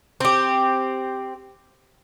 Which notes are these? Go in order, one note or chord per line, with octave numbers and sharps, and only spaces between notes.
C4 G4